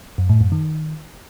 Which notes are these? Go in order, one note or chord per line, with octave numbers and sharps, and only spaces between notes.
F#2
A2
F#2
D#3